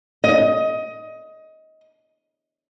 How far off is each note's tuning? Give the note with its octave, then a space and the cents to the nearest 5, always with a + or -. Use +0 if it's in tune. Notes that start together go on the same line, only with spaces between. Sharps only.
D#5 +20